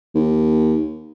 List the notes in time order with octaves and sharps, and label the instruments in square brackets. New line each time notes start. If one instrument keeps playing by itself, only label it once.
[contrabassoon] D#2